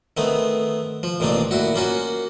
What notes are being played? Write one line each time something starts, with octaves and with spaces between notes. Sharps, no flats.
D#3 A3 B3 C4
F3
A1 A#2 D#3 C4 D4
A#2 E4 F#4
A#3 C#4 F4 F#4